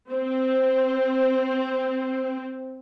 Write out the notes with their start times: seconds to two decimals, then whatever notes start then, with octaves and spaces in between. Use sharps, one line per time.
0.10 C4 C5